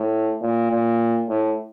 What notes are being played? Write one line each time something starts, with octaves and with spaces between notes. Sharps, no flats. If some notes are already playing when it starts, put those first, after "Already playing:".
Already playing: A2
A#2
A#2
A2